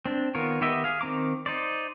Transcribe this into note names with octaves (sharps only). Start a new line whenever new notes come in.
C4 D4
D#3 B3 F4 A#4 C#5
D#3 B3 G4 D#5 E5
G#4 F5
D#3 C4 A#5 D6
D#4 C5 D5